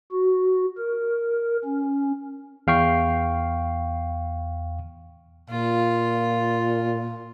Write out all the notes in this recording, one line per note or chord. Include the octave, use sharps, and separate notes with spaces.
F#4
A#4
C#4
E2 F5 G5 C#6 C7
A#2 F4